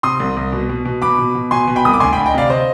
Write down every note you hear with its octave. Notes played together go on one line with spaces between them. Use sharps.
C3 C6 D#6
C2
C2
B2
B2
B2
B2 B5 D6
B2
B2
B2 G#5 C6
B2
G5 B5
C2 D#6
D6
D2 G#5 C6
G5 B5
D2
D#5 G5
C3 D5 F5
C5 D#5